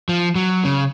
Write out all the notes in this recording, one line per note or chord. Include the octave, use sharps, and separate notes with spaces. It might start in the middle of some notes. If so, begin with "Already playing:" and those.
F3
F#3
C#3